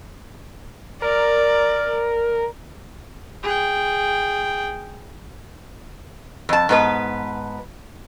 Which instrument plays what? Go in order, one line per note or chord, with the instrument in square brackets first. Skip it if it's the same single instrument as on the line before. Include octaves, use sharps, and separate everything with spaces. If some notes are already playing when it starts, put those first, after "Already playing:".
[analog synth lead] A#4 [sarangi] D5
[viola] G#4 G5
[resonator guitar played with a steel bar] F2 A5
G#2 B3 B4